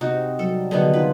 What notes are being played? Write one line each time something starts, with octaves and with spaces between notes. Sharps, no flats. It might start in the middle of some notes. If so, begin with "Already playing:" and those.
C3 C4 D#4 F#4
F#3 G3 A4
D3 D#3 F#3 G3 B3 G#4
D#4 F4 B4